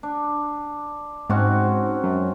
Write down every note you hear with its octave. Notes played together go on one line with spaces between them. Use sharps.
D4
G#2 C4 C#4 F#4
F#2